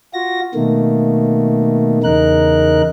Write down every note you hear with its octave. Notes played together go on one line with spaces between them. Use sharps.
F4 F#4 A#6
B2 D#3 A3 A#3
E2 C#3 D#4 A#4 F#6